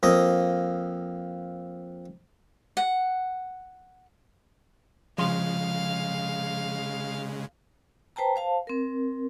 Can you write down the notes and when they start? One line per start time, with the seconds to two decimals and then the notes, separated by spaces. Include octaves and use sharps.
0.03 F2 A#3 D#5
2.77 F#5
5.18 C#3 F3 G#3 F5 C6
8.16 B4 C5 G5 A5 A#5
8.36 C5 F5 A5
8.67 C4 A#4